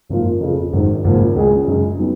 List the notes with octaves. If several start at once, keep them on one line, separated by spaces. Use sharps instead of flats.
G#1 F#2 F3 A#3 F4
F2 C#3 F3
G#1 F#2 D#3
G#1 F#2 C#3 F3 A#3
C#2 C#3 G#3 C#4 G#4
F#2 C#3 G#3 C#4 G#4
F#3 B3 D#4